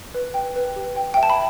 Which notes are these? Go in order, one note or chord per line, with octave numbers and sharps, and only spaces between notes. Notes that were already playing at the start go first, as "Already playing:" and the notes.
B4
G5
B4
G4
G5
G5
E5
A5
B5